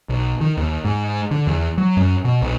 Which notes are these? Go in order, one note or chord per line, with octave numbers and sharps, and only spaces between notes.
B1
D#3
D#2
G#2
D3
E2
F#3
F#2
B2
B1